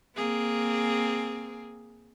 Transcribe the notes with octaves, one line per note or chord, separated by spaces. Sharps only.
A#3 C4 G#4